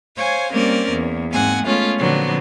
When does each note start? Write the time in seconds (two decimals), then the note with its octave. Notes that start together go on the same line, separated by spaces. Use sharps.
0.16 C5 C#5 F5 G#5
0.52 G3 A#3 C4 C#4 A#4 D5
0.89 E2 A#3
1.31 G#2 A#3 C4 F#5 G#5
1.66 G#3 A3 B3 C#4 F4 A4
1.98 A#2 D3 F3 F#3 B3 C4